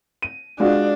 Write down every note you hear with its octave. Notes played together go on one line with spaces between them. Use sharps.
D#7
G#3 D4 F4 F#4